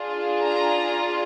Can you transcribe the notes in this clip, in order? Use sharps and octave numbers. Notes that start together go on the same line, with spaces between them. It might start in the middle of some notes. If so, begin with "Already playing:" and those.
Already playing: D4 F4 G#4
A#5